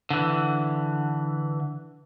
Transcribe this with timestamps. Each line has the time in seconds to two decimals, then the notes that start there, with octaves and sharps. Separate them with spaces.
0.10 D3 E3